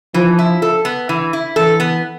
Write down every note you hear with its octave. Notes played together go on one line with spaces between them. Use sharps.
E3 F3
E4
A4
B3
E3
E4
E3 A4
B3